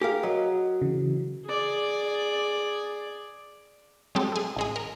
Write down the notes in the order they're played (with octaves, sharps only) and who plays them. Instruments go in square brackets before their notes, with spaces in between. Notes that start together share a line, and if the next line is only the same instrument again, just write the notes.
[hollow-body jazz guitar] G4 A#4 F5 [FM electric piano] G#4
[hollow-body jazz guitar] F#3 [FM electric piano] A#4 D#5 F#5
[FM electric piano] C#3 E3
[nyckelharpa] G#4 D5
[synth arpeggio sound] F#3 G#3 C4 G4 A4
A3 G#4
A1 G#3 G#4
A#4